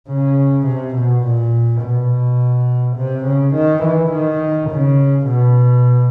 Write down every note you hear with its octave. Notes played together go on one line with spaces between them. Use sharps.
C#3
C3
B2
A#2
B2
C3
C#3
D#3
E3
D#3
C#3
B2